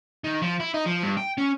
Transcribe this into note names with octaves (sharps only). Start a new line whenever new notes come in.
D#3
F3
E4
D#4
F3
G2
G5
C#4